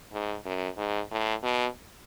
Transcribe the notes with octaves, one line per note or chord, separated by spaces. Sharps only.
G#2
F#2
G#2
A2
B2